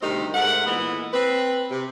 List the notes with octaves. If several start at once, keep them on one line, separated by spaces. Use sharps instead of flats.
D2 C3 D#3 G3 C4 D#4
G#2 A3 A#4 F#5
A#2 E3 G#3 B3
C4 B4
C3